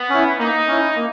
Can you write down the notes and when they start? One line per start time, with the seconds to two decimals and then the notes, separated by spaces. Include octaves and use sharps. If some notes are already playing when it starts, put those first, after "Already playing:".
Already playing: B3
0.10 C#4 E4
0.39 A#3 D#4
0.68 C#4 E4
0.96 A#3